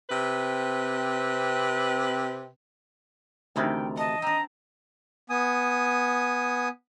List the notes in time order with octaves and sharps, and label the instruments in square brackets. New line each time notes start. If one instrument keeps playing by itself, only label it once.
[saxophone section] C3 C4 B4
[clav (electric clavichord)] D2 C3 A#4 [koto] D#3 E3 D4 [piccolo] G5
[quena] D#5 [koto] F#5 [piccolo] A5
[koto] C4 D4 [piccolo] A#5
[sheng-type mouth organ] B3 G#5 D#6